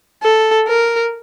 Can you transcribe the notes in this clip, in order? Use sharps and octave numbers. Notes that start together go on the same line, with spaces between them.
A4
A#4